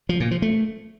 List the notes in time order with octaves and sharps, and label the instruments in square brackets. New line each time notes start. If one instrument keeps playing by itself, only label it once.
[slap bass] F3
A#2
F3
A3